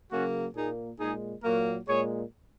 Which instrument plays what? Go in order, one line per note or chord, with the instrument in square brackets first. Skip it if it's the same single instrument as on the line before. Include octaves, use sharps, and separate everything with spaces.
[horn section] C#3 F#3 A#3 C#4 F#4
A#2 A#3 D#4 G#4
A#2 G#3 D#4 G#4
A#2 F#3 A#3 F#4 A#4
A#2 G#3 G#4 C#5